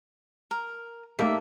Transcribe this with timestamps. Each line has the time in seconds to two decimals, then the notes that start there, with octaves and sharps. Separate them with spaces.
0.51 A#4
1.19 A3 A#3 D4 D#4 G4 E5